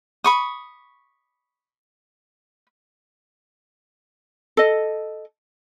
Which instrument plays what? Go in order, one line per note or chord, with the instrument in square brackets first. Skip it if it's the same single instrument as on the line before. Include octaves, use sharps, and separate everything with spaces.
[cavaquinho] B5 C#6 D#6
[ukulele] A4 D#5